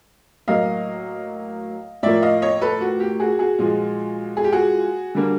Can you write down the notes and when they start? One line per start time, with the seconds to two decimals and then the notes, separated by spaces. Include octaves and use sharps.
0.48 A2 F#3 A#3 D#5 F5
2.03 A2 F3 A#3 D5 E5
2.22 D#5 F5
2.42 C#5 D#5
2.61 A4 B4
2.81 F#4
3.00 G4
3.20 F#4 G#4
3.39 F#4 G#4
3.58 A#2 F3 G#3
4.37 G#4
4.44 G4
4.52 F#4 G#4
5.15 D3 G3 A#3